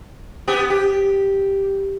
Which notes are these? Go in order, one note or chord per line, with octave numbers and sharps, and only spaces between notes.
B3 G4
G4